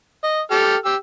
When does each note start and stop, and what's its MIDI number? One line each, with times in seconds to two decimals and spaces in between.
0.24 0.41 75
0.51 0.76 67
0.51 0.76 69
0.51 0.76 89
0.85 0.96 67
0.85 0.96 88